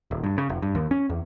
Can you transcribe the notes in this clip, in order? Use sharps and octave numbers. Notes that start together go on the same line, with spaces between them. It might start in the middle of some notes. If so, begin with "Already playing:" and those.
D#1
G2
C#3
F1
G2
D#2
C#4
E2